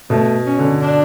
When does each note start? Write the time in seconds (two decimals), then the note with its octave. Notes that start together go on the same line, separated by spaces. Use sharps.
0.10 B2 A3
0.46 C#4
0.58 D3
0.82 D4